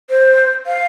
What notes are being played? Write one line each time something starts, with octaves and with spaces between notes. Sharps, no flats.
C5
F5